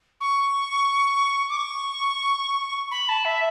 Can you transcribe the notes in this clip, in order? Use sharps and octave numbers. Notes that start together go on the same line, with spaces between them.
C#6
D6
C#6
B5
A5
E5